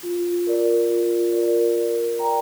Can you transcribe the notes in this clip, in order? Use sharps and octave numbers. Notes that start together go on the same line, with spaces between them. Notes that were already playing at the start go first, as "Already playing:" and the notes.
F4
A#4 D5
F4
A#4 D5
A#4
D5 G5 A#5